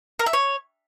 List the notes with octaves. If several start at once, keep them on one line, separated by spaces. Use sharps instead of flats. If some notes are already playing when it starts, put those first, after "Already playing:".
A#4
E5
C#5